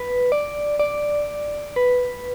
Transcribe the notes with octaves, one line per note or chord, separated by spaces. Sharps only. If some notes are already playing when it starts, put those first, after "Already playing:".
Already playing: B4
D5
D5
B4